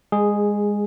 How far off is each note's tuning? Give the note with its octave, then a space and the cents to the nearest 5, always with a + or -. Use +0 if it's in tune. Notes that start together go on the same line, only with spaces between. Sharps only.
G#3 -20 G#4 +0